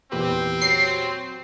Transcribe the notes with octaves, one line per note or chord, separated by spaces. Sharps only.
E2 A#2 C4 G4 B4
F#3 C7